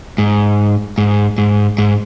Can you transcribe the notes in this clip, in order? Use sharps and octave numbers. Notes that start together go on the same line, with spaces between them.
G#2
G#2
G#2
G#2